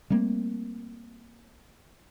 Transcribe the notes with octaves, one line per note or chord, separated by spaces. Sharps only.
G3 A3 A#3 C4